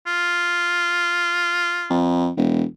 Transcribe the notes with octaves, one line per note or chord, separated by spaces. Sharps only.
F4
F2
E1